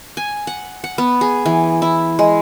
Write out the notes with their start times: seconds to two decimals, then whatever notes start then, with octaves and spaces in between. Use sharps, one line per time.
0.17 G#5
0.47 F#5
0.84 F#5
0.98 B3
1.21 G#4
1.46 E3
1.82 E4
2.19 G#3